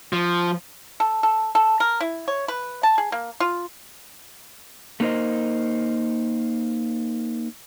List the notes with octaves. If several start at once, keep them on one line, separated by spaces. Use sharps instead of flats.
F3
A4
A4
A4
A#4
E4
C#5
B4
A5
G#4
A#3
F4
A3 A#3 D#4 A#4 C5 D#5